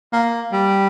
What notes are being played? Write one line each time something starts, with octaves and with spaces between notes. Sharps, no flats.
A#3
G3